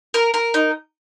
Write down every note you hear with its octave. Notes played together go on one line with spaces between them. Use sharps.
A#4
A#4
D#4